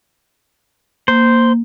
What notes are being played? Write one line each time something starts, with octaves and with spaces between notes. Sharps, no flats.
A#3 C5